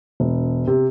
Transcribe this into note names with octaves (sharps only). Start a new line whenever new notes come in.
E1
C3